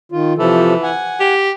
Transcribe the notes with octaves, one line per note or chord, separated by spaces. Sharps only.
D#3 F4
C3 E3 F3 A4
F#5 G#5
G4